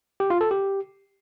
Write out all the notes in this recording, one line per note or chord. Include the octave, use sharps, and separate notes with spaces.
G4
F4
A4
G4